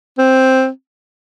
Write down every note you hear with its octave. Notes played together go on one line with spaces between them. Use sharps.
C4